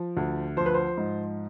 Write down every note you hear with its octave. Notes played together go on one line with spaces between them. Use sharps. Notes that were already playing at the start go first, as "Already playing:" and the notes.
Already playing: F3
D2
F3 C5
B4
C5
G#2